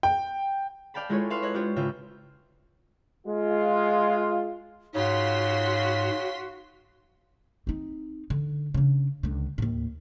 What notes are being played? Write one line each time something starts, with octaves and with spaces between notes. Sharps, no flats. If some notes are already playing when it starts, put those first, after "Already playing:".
G5
D5 F5 G5 A5 B5
G#3 E4 F4 G#4 A4 C#5
B4 E5 F5 C6
C#5 D#5 F#6 G#6
D4 F4 G4 C5 C#5
G#1 C#3 F4 E5 G5
G#3 F4
G#2 C#3 F4 F#4 C6 B6
C4 D#4
D3
C#3 D4
C#2 D3
D#2 A2